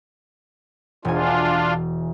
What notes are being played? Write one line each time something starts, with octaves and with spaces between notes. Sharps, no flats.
E1 D4 F4 G#5